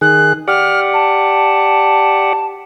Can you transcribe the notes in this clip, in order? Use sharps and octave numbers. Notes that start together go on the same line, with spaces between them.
D#3 G#4 F#6
G4 D5 F#5 F6
A5